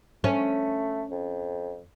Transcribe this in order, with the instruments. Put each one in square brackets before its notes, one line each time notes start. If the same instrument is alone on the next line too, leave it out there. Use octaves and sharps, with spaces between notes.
[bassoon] A3 [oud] C#4
[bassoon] F2